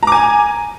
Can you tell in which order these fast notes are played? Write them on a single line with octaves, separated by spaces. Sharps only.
A#5 D6 G#5